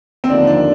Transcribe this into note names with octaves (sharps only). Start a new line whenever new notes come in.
C4
D#2 D3 F3 A#3 D4 D#4
D4